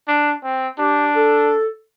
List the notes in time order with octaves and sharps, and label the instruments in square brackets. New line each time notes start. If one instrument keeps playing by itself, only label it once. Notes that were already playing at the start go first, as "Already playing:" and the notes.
[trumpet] D4
C4
[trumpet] D4 [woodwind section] G4
[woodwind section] A4